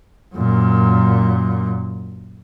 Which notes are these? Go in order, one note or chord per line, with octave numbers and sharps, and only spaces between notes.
F#2 A#2